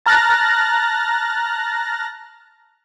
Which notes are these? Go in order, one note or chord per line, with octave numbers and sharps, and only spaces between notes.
A5 A#5 F6 F#6 A6 A#6